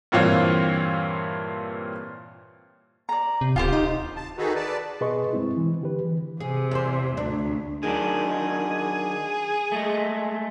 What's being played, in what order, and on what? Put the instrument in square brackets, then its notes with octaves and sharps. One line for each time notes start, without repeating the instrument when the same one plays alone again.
[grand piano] G2 A#2 E3 C4 C#5 F5
[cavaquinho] D5 A#5
[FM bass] C3
[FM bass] D1 [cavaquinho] F4 G4 C5
[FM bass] D#4
[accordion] D#2
A5
D#3 D#4 F#4 G#4 A4 B4
B4 D5 A5
[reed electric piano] B2 G#4 B4 D#5 C6 C#6
G2 G#3 C4 E4
E3
D3 G4 B4
E3
[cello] C3 [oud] G#4
[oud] E2 C5
[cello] D2 [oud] D4
[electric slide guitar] D#3 F#3 D4 [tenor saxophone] G#4
[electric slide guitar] G#3 A3